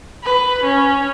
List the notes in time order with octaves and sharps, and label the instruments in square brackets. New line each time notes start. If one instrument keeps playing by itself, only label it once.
[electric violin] B4
C#4